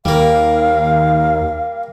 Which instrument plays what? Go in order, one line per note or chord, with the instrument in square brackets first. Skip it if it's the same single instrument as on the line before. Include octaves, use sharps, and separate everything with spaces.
[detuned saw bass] D#2 [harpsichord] G3 A#3 [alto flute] F5